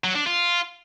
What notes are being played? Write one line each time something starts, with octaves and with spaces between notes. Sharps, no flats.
F#3
D4
F4